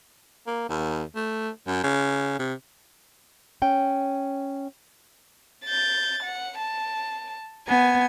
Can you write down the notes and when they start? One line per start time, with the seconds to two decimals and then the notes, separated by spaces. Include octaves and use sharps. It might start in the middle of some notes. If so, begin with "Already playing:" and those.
0.47 A#3
0.69 D#2
1.16 A3
1.67 F#2
1.84 C#3
2.39 C3
3.62 C#4 G5
5.65 G6 A6
6.23 F#5
6.59 A5
7.68 B3 G#5 G#6